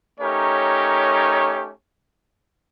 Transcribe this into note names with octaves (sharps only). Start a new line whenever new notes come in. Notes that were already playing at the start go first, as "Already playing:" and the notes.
A3 C#4 D#4 G4 A#4 C#5